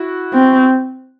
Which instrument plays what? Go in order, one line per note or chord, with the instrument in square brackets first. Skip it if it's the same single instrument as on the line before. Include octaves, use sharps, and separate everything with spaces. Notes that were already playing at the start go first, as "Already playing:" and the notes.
Already playing: [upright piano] E4 F#4
[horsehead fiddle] C4